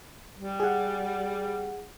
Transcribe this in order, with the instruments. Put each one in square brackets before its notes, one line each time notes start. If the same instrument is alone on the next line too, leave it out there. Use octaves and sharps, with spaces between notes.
[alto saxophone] G3
[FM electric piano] G#4 F#5